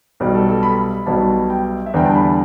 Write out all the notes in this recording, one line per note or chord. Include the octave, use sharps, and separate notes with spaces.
B1 B2 G3
A4
A4
B5
B1 B2 G3 A5
G5
E5
E2 D3 G3 G5
A5
B5